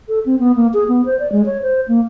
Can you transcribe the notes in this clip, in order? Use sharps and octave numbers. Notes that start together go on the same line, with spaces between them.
A4
C4
B3
A#3
G#4
B3
C5
D5
G#3
C#5
C5
A#3